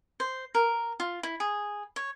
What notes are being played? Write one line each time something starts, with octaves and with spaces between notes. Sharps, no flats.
C5
A#4
F4
E4
G#4
C#5